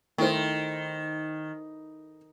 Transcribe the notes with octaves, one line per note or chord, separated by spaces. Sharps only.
D#3 A3 E4 C5